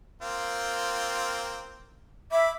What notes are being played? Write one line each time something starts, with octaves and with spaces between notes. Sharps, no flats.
A#3 C4 F4
E5 B5 D6